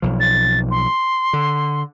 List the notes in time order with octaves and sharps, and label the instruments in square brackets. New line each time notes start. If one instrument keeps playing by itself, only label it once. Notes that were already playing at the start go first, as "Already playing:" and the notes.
[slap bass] B1 F3
[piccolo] A6
C6
[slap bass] D3